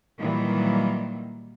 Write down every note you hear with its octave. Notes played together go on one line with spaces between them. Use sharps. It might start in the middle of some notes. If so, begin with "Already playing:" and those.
A#2 D#3 E3 F#3 G3 A#3